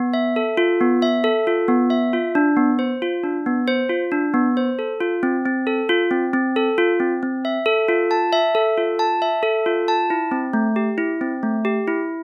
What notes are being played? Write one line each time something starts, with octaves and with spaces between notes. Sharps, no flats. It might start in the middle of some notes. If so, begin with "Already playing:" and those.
Already playing: B3
E5
A4
F4
B3
E5
A4
F4
B3
E5
F4
D4
B3
C5
F4
D4
B3
C5
F4
D4
B3
C5
A4
F4
C4
C4
A4
F4
C4
C4
A4
F4
C4
C4
E5
A4
F4
A5
E5
A4
F4
A5
E5
A4
F4
A5
E4
C4
A3
G4
E4
C4
A3
G4
E4